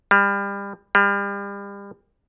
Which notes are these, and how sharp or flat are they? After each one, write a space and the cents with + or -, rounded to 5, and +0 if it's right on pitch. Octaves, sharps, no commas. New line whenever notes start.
G3 +30
G3 +35